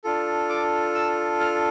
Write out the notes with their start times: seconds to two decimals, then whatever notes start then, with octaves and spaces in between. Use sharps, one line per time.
0.04 D4 F4 A4
0.49 D6
0.95 E6
1.40 F6